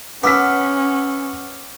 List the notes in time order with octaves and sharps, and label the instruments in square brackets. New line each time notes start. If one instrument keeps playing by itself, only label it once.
[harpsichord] B3 [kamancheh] C#4 [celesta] F#5 F6 [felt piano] D6 E6 B6